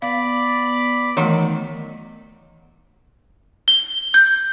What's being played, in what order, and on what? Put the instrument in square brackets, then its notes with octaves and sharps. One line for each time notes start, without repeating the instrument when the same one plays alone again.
[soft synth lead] B3 [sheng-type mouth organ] D5 B5 [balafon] F5
[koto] D#3 F#3 [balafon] E3 A3
[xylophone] G7
G6